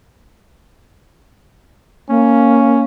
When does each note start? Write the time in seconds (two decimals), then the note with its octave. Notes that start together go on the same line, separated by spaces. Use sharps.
2.09 A#3 C#4